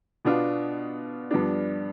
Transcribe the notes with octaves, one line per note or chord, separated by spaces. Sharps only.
B2 B3 D4 F4
G2 F3 B3 D4